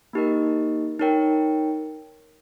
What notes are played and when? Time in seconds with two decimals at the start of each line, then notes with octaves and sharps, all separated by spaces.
0.13 A#3 D#4 G4 A#4 D#5
1.00 D#4 A#4 C#5 G5